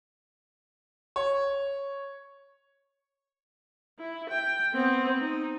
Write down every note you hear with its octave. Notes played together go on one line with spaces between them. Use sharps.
C#5
E4
G5
B3 C4
D#4